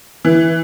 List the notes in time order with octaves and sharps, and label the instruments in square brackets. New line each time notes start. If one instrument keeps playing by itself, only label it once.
[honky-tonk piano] E3